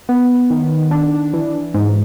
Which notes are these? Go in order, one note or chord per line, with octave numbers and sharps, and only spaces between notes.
B3
D#3
D4
E3
G#2